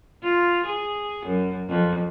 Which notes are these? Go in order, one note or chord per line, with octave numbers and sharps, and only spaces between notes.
F4
G#4
F#2
F2